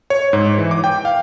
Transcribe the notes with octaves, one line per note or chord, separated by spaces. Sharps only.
C#5
G#2
E3
D6
G5
F5